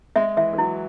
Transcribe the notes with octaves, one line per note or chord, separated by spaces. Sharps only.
G#3 E5
E3 E5
E3
F#3 E4